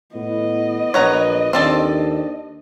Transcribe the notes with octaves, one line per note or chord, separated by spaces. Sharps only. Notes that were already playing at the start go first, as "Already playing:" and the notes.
A2 B3 D#5
A#1 B4 C#5 F#5 A#5
D#2 C4 D4 A4 D5